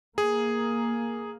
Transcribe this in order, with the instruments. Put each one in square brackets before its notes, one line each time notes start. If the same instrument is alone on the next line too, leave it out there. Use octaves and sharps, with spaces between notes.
[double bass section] A#3 [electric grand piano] G#4